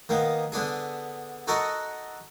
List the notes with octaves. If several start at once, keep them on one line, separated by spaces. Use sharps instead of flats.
D#3 A#3 B3
D3 B3 D4 G#4
D#4 F#4 A4 A#4 C#6 D#6